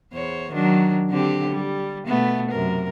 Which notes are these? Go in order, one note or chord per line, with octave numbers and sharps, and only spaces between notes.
E2 C5 C#5
D#3 F#3 D4
D3 C4 G4
G3
B2 A3 B3
F#2 C3 A#4